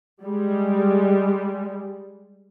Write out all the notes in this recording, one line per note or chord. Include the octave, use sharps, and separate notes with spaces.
G3 G#3